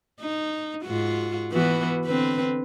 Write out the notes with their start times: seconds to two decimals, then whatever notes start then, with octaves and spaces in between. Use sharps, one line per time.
0.20 D#4
0.84 G#2 F4 F#4
1.52 E3 B3 F#4
2.06 D3 C4 B4